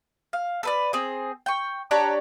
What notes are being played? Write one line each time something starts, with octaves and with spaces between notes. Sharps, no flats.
F5
A4 B4 D5
C4 G#4
G5 C#6
D4 G4 C#5 A#5